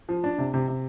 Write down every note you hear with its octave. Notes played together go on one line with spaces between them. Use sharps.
F3
D4
C3
C3
C3